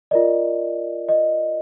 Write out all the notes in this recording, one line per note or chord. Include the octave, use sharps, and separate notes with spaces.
F4 A#4 D5 D#5
D#5